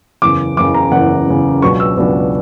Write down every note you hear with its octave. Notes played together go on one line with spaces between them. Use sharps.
F#1 E2 C#3 D6
F#1 E2 C#3 D6
A#5
F#1 E2 C#3 F#5
F#1 E2 C#3
C#2 B2 F#3 B3 D4 C#6
E6
C#2 B2 F#3 B3 D4